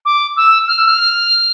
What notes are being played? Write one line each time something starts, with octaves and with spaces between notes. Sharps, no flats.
D6
E6
F6
E6
F6